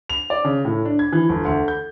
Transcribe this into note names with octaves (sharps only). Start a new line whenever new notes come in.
F7
D5
C#3
A2
D4
G#6
E3
G1
D2
G6